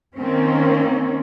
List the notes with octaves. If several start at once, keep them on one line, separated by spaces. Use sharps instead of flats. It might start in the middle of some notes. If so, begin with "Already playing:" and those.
D#3 A#3 C4 C#4